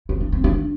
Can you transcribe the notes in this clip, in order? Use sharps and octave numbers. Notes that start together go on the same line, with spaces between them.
E4
D4
C4
D4